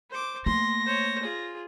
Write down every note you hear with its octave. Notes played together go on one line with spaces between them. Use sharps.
C5 D6
A3 A#3 C6 A#6
C5 C#5
F4 G#4